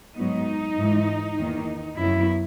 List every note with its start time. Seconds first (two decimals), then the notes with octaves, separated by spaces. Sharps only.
0.16 G#2 F#3 B3 D#4
0.77 G#2 E3 G#3
1.38 E2 D#3 A#3
1.98 F#2 C#3 F#3 B3 E4